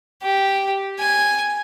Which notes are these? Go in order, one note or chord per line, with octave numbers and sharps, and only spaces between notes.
G4
G#5